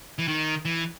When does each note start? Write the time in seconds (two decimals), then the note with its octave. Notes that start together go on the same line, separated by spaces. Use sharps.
0.18 E3
0.28 D#3
0.65 E3